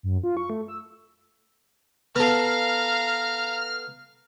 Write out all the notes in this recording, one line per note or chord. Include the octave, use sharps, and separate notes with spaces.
F#2
F4
C#6
A3
E6
B3 A4 F5 A#5 F6